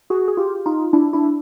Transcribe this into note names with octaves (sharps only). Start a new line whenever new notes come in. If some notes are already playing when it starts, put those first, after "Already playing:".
F#4 G#4
G#4
F4 G4
D#4 F4
D4 E4
D4 E4